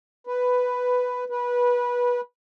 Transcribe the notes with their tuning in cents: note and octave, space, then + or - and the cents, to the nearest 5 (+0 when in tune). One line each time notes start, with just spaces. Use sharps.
B4 +5
B4 -20